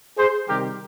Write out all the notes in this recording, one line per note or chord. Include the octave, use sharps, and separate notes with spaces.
G#4 C5
C3 D#3 G3 G4 A#4